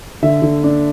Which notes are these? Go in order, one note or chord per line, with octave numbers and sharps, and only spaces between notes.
D3 E5
D3
D4